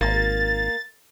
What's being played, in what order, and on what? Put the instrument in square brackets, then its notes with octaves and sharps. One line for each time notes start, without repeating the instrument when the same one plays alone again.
[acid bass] G#1 [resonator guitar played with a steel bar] A#3 [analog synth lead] A6